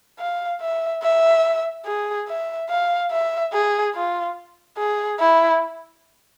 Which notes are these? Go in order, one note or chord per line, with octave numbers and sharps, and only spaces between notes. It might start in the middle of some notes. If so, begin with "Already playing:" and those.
F5
E5
E5
G#4
E5
F5
E5
G#4
F4
G#4
E4